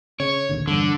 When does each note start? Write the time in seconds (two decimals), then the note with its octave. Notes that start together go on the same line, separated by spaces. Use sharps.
0.20 C#3 C#5
0.49 D#2 A#2 D3
0.67 E2 G2 D3